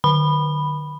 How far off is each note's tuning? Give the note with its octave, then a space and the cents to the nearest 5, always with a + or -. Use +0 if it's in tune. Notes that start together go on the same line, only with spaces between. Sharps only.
D3 +35 B5 +0